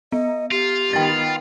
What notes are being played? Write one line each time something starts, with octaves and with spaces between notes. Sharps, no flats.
B3 D#5
F4 G4
D#3 B3 G5 A6